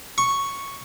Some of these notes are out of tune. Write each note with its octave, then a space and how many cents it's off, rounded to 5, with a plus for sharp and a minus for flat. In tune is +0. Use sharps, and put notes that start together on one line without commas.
C#6 +0